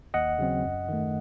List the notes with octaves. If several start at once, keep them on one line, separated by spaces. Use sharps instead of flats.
D#2 D#5 F#5
C#3 F#3 C4
F#2
D#3 A3